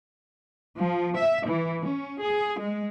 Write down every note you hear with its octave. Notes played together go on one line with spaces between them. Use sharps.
F3
E5
E3
C#4
G#4
G#3